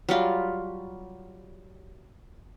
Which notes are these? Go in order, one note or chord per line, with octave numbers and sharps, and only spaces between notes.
F#3 G3 F4